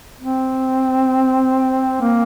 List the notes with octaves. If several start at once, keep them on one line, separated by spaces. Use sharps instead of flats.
C4
A#3